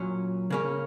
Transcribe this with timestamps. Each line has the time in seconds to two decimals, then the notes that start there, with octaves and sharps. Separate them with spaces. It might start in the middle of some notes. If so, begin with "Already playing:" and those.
Already playing: A#2 F#3 C#4
0.50 C#3 A#3 C#4